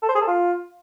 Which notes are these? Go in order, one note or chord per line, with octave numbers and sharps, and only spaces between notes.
A4
C5
G#4
A4
F4